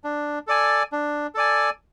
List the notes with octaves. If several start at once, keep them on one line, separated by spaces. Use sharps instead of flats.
D4
A4 D5 G#5
D4
A4 D5 G#5